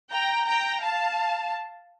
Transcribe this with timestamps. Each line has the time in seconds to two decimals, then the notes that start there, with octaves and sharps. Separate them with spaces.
0.10 G5 A#5
0.47 G5 A#5
0.83 F5 A5